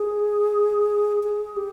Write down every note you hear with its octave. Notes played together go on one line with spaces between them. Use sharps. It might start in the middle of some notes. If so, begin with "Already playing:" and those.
Already playing: G#4
G#4
G4